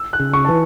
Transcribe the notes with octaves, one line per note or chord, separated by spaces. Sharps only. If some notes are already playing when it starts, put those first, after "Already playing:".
Already playing: E6
F#6
C#3
C#6
E3 A5